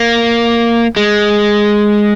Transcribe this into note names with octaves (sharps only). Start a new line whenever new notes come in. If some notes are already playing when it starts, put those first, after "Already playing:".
Already playing: A#3
G#3